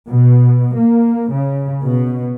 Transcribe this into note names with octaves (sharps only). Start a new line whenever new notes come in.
B2
A#3
C#3
B2